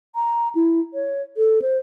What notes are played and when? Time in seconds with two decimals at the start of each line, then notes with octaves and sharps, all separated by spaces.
0.15 A#5
0.55 E4
0.94 C#5
1.37 A4
1.62 C5